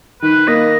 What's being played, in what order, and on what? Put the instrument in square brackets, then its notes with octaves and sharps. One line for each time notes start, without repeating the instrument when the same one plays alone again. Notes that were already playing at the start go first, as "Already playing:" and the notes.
[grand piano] D#3 [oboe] B4
[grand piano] A#3 [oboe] D#5